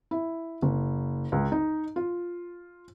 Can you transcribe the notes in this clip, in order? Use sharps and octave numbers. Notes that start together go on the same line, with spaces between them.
E4
F#1
C#2
D#4
F4